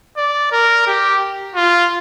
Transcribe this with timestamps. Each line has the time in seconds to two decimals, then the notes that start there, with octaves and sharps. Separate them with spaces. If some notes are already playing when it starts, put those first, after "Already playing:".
0.17 D5
0.51 A#4
0.87 G4
1.55 F4